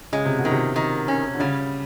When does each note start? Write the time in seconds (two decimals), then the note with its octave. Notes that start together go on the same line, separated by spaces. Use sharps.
0.13 C#3 G#3
0.25 C3
0.38 B2
0.45 D#3
0.51 C3
0.76 D#3
1.08 C#4
1.35 D3
1.40 C#3 G3